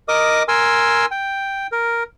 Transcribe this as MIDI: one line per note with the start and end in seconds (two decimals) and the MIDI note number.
0.08 0.43 70
0.08 0.43 75
0.08 0.43 86
0.08 0.43 87
0.48 1.06 70
0.48 1.06 80
0.48 1.06 84
0.48 1.06 88
1.11 1.67 79
1.72 2.03 70